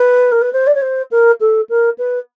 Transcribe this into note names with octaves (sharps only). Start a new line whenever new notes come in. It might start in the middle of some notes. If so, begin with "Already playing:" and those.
Already playing: B4
A#4
B4
C5
D5
C#5
C5
A#4
A4
A#4
B4